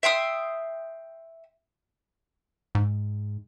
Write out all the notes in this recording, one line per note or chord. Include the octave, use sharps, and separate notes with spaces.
E5 G5 C6 D#6
G#2